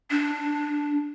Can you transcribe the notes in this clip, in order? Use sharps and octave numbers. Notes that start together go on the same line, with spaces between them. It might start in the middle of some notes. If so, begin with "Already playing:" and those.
D4